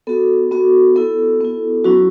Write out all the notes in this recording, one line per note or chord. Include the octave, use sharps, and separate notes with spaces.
B3 F#4 A4
B3 F#4
B3 E4 A4
B3 E4
F#3 C#4 E4 F#4